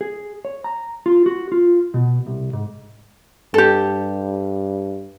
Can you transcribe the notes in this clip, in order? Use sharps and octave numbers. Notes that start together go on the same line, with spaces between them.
G#4
C#5
A#5
F4
F#4
F4
B2
C2
G#2
G2 G4 A4